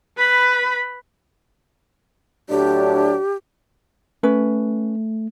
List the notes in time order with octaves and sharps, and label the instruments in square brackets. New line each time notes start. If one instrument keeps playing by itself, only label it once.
[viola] B4 B5
[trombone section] A2 F#3 D4 [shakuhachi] G4
[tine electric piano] A3 [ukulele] C#4 B4